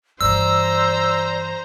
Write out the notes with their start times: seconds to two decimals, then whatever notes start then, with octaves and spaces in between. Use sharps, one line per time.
0.21 G2 E3 C5 D5 A#5 E6